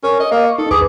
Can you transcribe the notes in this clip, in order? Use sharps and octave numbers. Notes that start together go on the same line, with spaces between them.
C#4 A#4
D#5
A#3 D#5
C#6
D#4 A4
D#2 G#4 B4 D6